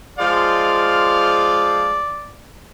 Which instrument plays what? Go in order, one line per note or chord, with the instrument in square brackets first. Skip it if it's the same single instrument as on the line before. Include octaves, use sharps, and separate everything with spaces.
[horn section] F3 G#3 F5 [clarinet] D5